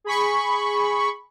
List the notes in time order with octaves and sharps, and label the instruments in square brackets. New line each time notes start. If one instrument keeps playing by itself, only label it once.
[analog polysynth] G#4 B5 C#6